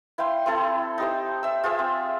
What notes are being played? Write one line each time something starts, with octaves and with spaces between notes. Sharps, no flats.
E4 F5 G5 C6
C4 E4 A4
D#4 G4 C5
E5 E6
F4 G#4 C5 E5
C4